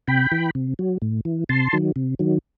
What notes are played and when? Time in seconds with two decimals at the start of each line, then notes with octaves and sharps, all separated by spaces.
0.07 C3 G5 B5
0.32 E3
0.55 C3
0.79 F#3
1.02 A2
1.25 E3
1.49 C3 A5 C6
1.73 D#3 F#3
1.96 C3
2.19 D#3 F#3